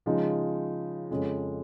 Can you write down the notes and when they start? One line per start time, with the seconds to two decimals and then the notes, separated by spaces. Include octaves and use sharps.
0.06 C#3 F3 G#3 D#4
1.10 F2 C#3 F3 G#3 C#4